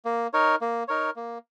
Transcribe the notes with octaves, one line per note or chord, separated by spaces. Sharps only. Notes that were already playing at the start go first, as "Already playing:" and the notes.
A#3
D#4 A#4 C#5
A#3
D#4 A#4 C#5
A#3